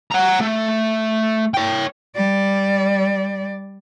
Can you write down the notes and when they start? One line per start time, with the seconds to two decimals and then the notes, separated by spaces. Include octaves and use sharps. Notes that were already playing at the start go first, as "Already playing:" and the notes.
0.12 F#5 A#5
0.41 A3
1.54 C#5 G5
2.15 G3 D5